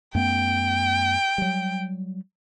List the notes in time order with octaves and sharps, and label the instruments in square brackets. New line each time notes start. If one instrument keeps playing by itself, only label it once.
[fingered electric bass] F#2 A3 B3 [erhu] G5
[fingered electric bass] F#3 G3